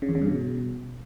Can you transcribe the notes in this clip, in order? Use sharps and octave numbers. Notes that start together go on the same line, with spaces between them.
C#3
E2
C#3
G2
B2